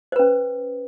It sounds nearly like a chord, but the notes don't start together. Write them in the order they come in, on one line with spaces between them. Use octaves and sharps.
C5 B4 C#4